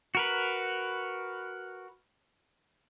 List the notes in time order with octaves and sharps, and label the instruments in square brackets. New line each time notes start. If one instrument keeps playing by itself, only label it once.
[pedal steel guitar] F#4 A#4 B4